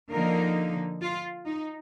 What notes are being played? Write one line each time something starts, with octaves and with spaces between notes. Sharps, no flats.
D3 F3 A#3 D#4 A#4
F4
D#4